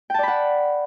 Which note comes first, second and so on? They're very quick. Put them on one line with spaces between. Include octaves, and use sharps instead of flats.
G5 A5 D5 B5 F#5